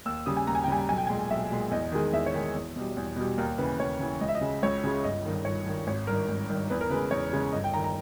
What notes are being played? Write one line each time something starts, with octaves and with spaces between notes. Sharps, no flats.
D#2 E6
C#3 G3 D#6
G#5
D#2 A#5
G#5
G5
C#3 G3 G#5
B1 G#5
G5
G#5
A#2 G#3
B1 E5
A#2 G#3
E2 D#5
D#3 G#3
E2 E5
C#5
D#3 G#3
E2
B2 G3
E2
B2 G3
D#2 A#4
C#3 E3 B4
D#2 C#5
C#3 E3
C#2 D#5
E5
D#5
C#3 G#3
C#2 C#5
C#3 G#3
G1 D#5
G2 D#3
G1 C#5
G2 D#3
G#1 C#5
G2 D#3 A#4
G#1
G2 D#3
E2 B4
A#4
C#3 G#3 B4
E2 C#5
C#3 G#3
G1 D#5
G5
D#3 A#5
A#5